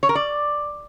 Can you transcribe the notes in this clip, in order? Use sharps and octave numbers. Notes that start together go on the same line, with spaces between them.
C#5
A#4
D5